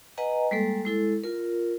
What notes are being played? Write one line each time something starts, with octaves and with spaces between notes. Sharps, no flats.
B4 D#5 F#5 G#5 A#5
G3 G#3 A#3 A4
G#3 E4 A4
F4 A#4